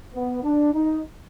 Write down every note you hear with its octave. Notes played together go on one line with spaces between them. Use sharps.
B3
D4
D#4